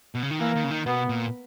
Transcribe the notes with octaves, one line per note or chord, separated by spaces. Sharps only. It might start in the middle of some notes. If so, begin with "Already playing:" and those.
B2
C#3
D#3
E3 A#3
D#3
C#3
D#3
B2 B3
A#2